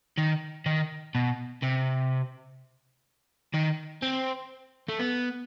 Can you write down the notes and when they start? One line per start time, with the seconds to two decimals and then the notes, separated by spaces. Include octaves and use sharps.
0.17 D#3
0.66 D#3
1.15 B2
1.63 C3
3.54 D#3
4.02 C4
4.89 A3
4.99 B3